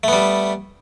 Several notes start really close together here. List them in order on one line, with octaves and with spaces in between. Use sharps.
A3 B3 G3